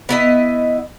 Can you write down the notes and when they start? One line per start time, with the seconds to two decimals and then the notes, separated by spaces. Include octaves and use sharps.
0.09 B3 E4 D#5